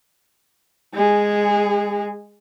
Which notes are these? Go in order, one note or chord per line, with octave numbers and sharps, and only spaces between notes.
G#3 G#4